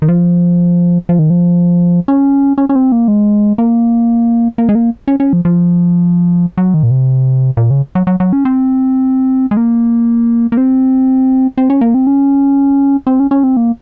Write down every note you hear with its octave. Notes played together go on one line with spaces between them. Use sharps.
D#3
F3
F3
D#3
F3
C#4
C#4
C#4
C4
A#3
G#3
A#3
A#3
G#3
A#3
C#4
C#4
F3
F3
F#3
D#3
A#2
C3
A#2
C#3
F#3
F#3
F#3
C#4
C4
G#3
A#3
A#3
C4
C4
C#4
A#3
C4
C#4
C4
C#4
C#4
C4
A#3